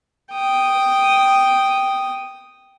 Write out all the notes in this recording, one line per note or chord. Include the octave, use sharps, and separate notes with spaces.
G5 D#6